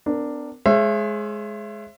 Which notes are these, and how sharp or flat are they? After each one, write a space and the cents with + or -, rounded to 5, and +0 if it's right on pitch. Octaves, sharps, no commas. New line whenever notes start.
B3 +45 D4 +0 A#4 -10
G#3 +15 C#5 -45 E5 +25